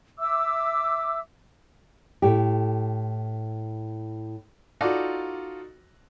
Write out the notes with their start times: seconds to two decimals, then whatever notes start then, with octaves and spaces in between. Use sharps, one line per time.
0.18 E5 D6 E6
2.22 A2 G4
4.81 D#4 F4 F#4 A4 D5